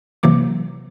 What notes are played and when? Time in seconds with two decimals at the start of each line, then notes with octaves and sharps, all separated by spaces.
0.23 C3 E3 F#3 A#3 D6